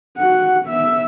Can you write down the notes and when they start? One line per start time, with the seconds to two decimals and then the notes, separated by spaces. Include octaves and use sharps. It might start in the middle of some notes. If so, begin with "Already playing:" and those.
0.18 F#4 F#5
0.65 B3 E5